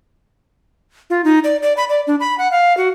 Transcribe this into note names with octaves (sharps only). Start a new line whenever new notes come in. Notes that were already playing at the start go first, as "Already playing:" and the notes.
F4
D#4
D5
D5
B5
D5
D4
B5
F#5
F5
F#4